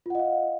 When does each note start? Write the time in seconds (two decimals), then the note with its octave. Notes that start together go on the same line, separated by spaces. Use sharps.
0.06 F4
0.10 F#5
0.15 D#5
0.19 F5